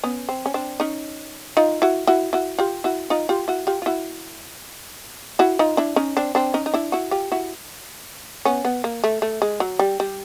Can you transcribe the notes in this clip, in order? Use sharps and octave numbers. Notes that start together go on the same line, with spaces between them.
B3 C#4
C4
C#4
C4 D4
C#4 D#4
D#4 F4
E4 F#4
E4 F#4
E4 F#4
F4 G4
E4 F#4
D#4 F4
F4 G4
E4 F#4
F4 G4
F4
E4 F#4
E4 F#4
D#4 F4
D4 E4
C#4 D#4
C4 D4
C4 D4
C#4 D#4
D#4
D4 E4
E4 F#4
F4 G4
E4 F#4
B3 C#4
B3
A#3
A3
A3
G#3
F#3
G3
G3